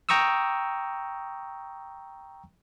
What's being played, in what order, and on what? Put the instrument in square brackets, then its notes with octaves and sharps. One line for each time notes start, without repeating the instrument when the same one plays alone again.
[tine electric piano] G5 A#5 C#6 D#6 E6